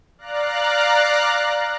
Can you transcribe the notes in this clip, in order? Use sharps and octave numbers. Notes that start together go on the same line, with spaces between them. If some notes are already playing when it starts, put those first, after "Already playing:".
D5 F5 A#5 F#6